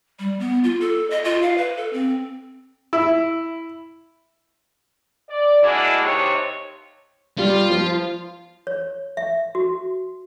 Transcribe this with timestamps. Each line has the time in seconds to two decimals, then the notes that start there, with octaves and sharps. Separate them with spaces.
0.19 G3
0.40 B3
0.64 F4
0.81 A4
1.10 D#5
1.25 F4
1.42 F5
1.58 B4
1.77 A4
1.93 C4
2.93 E4
5.29 D5
5.63 G#3 A#3 D4 E4 F#4 G#4
6.02 D#2 C3 C#5
7.39 G3 F4
7.70 F3
8.67 C#5
9.17 E5
9.55 F#4